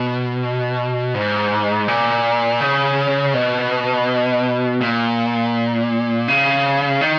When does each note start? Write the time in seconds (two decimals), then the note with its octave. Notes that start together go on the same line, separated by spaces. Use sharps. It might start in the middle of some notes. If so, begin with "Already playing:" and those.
Already playing: B2
1.14 G#2
1.88 A#2
2.61 C#3
3.34 B2
4.81 A#2
6.28 C#3
7.01 D#3